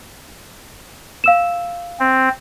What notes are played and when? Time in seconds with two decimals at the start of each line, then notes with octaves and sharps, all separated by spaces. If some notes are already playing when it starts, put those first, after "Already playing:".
1.24 F5 E6 E7
2.00 C4